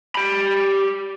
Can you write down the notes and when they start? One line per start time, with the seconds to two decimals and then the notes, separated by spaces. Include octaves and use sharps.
0.15 G4 B5